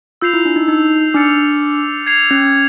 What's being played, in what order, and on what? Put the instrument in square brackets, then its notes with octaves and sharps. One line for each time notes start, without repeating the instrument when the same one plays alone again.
[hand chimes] F4 [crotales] E6 G6 C7 F7
[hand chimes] E4
D4
D#4
D#4
[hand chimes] D4 [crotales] D6 F6 A6 C#7 F7
[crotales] G#6 C7 F7
[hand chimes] C#4